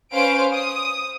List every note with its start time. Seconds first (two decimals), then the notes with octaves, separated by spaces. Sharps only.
0.12 C#4 B4 C5 F5 D7
0.51 D#6